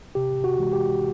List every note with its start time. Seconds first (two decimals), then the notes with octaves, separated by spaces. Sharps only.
0.15 C3 G4
0.44 F#4
0.58 E3 G#3
0.73 G4